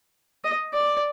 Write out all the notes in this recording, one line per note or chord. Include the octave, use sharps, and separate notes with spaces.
D#5
D5